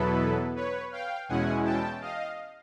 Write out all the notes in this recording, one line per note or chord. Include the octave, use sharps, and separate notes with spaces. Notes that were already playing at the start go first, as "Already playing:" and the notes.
Already playing: E2 B2 F#3 B3 E4 A4 B4
B4 C#5
F5 G5
E2 B2 G#3 C#4 E4 F#5 G#5
G5 A5
D#5 F5